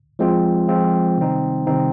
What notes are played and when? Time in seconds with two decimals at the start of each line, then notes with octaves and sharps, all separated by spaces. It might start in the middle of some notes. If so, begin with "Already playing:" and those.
0.19 F3 G#3 C4 F4
0.68 F3 G#3 C4 F4
1.18 C3 D#3 G3 C4 D#4
1.67 C3 D#3 G3 C4 D#4